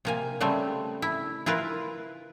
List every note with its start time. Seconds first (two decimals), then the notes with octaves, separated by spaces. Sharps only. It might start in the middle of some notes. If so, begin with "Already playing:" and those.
0.05 C3 A#3 G#5
0.41 C#3 G3 A3 C4
1.02 E4
1.46 E4 F4 A#4 B4